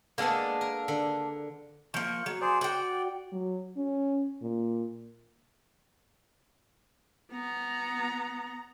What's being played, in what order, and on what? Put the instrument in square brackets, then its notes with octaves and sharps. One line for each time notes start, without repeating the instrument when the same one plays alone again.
[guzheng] G#3 B3 [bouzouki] A#3 D4 A4
[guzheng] A#4
D3
[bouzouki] F3 A#3 [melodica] C#6
[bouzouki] F#3
[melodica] G#4 C5 D5
[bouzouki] F#4 G5 [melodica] D5
[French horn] F#3
C#4
A#2
[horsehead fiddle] B3 A#5